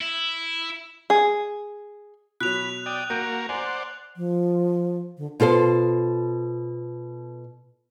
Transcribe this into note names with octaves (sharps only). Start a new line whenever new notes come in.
E4
G#4
B2 F#3 B5 F#6 F7
D5 G5 D#6
A#3 F#4 A#4 G6 D7 D#7
C5 D5 F#5 G#5 A#5
F3
D3
B2 F4 A4 C5